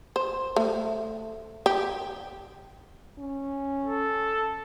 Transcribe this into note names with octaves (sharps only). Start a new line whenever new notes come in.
C5
A3
G4
C#4
A4